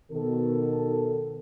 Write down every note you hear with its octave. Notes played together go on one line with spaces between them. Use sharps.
B2 D#3 A4